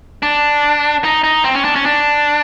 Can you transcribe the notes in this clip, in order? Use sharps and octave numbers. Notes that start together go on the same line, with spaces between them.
D4
D#4
D#4
C4
C#4
D4
C#4
D4